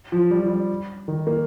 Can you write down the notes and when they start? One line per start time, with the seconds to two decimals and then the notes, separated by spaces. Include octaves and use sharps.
0.12 F3
0.31 G3
0.40 F3
0.48 G3
1.08 D#3
1.27 A#3